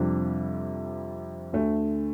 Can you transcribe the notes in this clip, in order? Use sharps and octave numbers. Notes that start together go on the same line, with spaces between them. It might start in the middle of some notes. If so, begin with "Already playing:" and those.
Already playing: F2 C3 G3 D4
D2 D3 A3